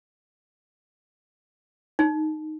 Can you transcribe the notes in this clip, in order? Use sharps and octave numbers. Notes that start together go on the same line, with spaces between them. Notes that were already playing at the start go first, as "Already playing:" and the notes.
D#4